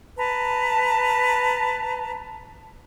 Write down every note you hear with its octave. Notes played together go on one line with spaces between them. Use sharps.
B4 A5 A#5